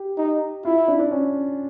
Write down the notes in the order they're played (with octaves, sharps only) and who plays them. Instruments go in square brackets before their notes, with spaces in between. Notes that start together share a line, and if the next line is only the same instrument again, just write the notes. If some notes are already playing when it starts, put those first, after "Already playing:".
Already playing: [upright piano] G4
[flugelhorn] D#4
[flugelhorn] E4 [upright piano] F4
[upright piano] D4
D4
C#4